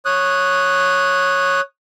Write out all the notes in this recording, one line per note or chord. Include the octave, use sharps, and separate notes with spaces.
C#5 D#6 F#6